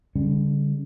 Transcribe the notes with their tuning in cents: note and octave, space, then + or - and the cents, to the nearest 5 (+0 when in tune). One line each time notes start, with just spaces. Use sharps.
D3 -35 G3 +20 C#4 +0